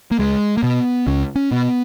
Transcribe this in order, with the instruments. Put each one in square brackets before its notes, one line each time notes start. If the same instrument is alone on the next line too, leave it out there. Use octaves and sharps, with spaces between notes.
[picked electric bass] A#3
C#2 G#3
A#3
B2 B3
C#2 C#4
C#4
B2 B3